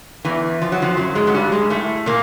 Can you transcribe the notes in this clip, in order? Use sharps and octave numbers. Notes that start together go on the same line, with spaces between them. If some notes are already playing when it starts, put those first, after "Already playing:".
E2 E3
F3
F#3
F2 F3
F#2 F#3
G#2 G#3
F#3
G2 G3
G#2 G#3
A2 A3
A#2 A#3